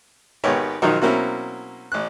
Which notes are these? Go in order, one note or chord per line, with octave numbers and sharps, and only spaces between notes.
G#1 D#3 B3 G4 C#5
B1 D#3 F3 F#3 D#4
B2 F#3 A#3 C4 C#4 E4
A1 F#6